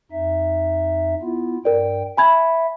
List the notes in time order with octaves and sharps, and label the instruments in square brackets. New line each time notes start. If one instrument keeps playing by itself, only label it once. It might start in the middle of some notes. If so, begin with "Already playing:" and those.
[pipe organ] F2 D#4 E5
B3 E4 F4
[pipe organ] G2 G5 [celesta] A#4 D5
[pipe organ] E5 [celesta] G#5 B5 G#6